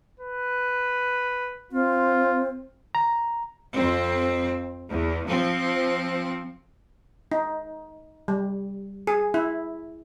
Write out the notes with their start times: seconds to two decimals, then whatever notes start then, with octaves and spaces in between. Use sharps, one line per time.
0.20 B4
1.72 C4 F4
2.95 A#5
3.74 F2 C4
4.89 E2
5.27 F3 C4
7.32 D#4
8.28 G3
9.07 G#4
9.34 E4